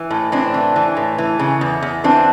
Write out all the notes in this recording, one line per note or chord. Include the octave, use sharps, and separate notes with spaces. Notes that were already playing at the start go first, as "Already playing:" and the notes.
Already playing: E3
A2
A2 C4 D4
E3
E3
A2
E3
C#3
E2
E2
E3 C4 D4